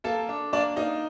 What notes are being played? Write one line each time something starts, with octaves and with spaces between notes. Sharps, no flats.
A#3 A4 A5
D4
A#3 D4 D5
A#3 D#4 D#5